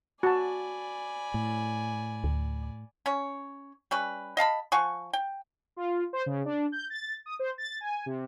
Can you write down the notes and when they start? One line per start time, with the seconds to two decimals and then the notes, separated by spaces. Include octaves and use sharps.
0.23 F#4 D5 G#5 A5 B5
1.34 A2
2.24 D2
3.06 C#4 C#5
3.91 G3 C#4 B4
4.37 D#5 F5 A5 B5
4.72 F3 F#5 G#5 C#6
5.13 G5
5.76 F4
6.13 C5
6.26 C#3
6.45 D4
6.72 G6
6.90 A6
7.26 D#6
7.39 C5
7.58 A6
7.81 G#5
8.06 C3